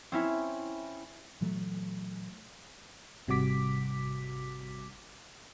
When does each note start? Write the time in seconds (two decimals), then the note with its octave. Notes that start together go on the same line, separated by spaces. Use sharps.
0.12 C4 C#4 E4
1.41 A#2 E3 F#3 A3
3.28 G#1 C3 G3 F#4 D6 B6